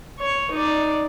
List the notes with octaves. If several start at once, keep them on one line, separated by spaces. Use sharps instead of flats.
C#5
D#4 D5